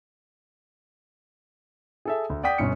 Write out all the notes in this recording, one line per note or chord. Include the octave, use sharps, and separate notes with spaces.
G#4 A4 E5
D2
D5 F#5 G5 D#6 B6
G1 B2 C#4 C#7